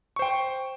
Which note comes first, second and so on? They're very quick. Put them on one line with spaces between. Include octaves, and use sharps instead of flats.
C#6 C5 G5